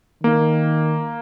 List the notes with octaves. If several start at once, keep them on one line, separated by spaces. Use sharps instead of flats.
D#3 A#3